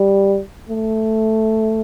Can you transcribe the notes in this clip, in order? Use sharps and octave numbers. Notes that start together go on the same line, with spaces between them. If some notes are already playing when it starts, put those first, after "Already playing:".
Already playing: G3
A3